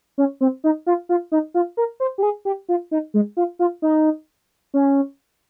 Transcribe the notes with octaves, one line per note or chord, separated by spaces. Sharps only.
C#4
C4
D#4
F4
F4
D#4
F4
A#4
C5
G4
G#4
G4
F4
D#4
G#3
F4
F4
D#4
C#4